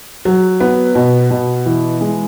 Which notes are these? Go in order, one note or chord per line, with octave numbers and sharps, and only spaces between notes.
F#3
B3
B2
B2
E3
G#3